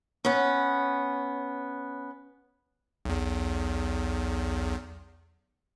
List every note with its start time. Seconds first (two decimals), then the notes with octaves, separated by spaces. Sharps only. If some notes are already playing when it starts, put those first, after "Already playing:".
0.25 B3 C#4
3.05 B1 E2